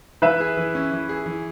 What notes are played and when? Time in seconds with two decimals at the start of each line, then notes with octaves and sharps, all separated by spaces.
0.22 E3 B4 E5
0.40 G#4
0.57 E3
0.75 C#4
0.92 E3
1.09 G#4
1.26 E3